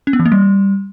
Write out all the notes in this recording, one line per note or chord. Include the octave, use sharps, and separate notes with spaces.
C#4
B3
E3
A#3
G3